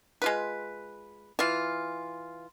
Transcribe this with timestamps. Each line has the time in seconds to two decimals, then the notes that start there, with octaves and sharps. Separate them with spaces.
0.22 G#3 F4 B4
1.39 E3 F4